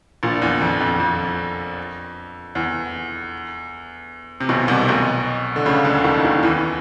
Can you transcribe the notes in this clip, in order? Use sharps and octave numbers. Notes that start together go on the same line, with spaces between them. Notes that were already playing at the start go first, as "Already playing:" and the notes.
A#1 A#2
E2
F2
F2
F2
E2
C3
B1 B2
C2 C3
B1 B2
D3
C#2 C#3
D2 D3
D#2 D#3
D#2 D#3
E2 E3